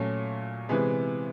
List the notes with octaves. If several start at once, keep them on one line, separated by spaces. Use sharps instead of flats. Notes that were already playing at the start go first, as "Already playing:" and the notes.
Already playing: A#2 F#3 A3 C#4
C3 E3 G#3 B3